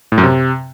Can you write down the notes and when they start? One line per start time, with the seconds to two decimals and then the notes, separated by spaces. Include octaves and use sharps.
0.12 A2
0.18 F#2
0.24 C3